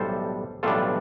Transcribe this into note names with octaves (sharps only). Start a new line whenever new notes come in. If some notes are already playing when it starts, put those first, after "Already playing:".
Already playing: B1 A2 E3 G3 D4 A4 C5
B1 A2 E3 G3 D4 F4 A4